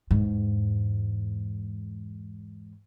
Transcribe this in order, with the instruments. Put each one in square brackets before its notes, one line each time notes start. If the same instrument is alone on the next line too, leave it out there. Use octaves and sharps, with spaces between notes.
[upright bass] E2 G#2